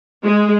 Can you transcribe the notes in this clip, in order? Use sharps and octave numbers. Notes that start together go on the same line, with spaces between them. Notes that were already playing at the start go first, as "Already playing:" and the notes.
G#3